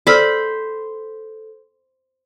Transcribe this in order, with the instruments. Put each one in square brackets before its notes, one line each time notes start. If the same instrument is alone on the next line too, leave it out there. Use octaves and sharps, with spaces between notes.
[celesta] A4 [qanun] C5 B5 [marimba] D5 E6 F6